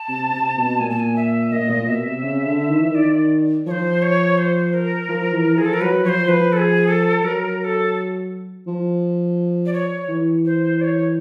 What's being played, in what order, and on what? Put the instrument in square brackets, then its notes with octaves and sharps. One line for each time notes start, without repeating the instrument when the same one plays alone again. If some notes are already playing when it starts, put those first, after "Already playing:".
Already playing: [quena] A5
[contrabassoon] C3
C3
B2
[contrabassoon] A#2 [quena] G#5
[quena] A5
G#5
E5
[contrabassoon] A#2 [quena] D#5
[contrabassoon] A#2
[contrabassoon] B2 [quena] E5
[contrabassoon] C3
C#3
D3
D#3
E3
D#3
[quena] D5
[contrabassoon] F3 [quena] C5 C#5
[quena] C#5
C5
A#4
[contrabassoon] F3
E3
[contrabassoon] F3 [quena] G#4
[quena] A4
A#4
[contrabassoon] F#3 [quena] B4
[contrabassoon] F3 [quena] C#5
[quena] C5
[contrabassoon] F3 [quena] B4
[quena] A4
G#4
A4
[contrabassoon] F#3 [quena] A#4
[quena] A#4
A4
[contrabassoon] F3
[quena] D5
C#5
[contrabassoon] E3
[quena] C5
D5
C#5